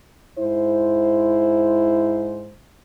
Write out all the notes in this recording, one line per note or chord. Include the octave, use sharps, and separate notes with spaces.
G#2 E4 C5